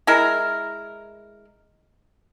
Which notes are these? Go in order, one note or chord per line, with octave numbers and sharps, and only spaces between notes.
G#3 E4 A#4